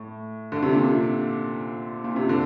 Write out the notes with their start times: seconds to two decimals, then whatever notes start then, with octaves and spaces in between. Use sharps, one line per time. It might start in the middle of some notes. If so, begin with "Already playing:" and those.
Already playing: A2
0.52 D3
0.62 C3
0.73 A#2
0.84 C3
2.04 A#2
2.16 C3
2.29 D3